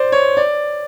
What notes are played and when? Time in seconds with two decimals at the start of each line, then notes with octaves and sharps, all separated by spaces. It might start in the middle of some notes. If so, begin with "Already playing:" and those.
Already playing: C5 D5
0.12 C#5
0.37 D5